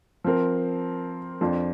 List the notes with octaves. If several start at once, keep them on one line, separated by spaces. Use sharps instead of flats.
F3 C4 A#4
F2 F3 D4